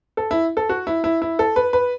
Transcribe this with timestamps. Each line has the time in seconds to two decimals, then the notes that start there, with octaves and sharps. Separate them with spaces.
0.17 A4
0.31 E4
0.57 A4
0.69 F#4
0.87 E4
1.04 E4
1.22 E4
1.39 A4
1.56 B4
1.73 B4